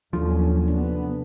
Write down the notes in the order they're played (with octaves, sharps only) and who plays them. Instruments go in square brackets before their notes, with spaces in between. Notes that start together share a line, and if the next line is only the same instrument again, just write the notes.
[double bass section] D#2 F#3 C#4 [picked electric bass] F3 [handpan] D4 A4
[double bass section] C3 B3 [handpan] D4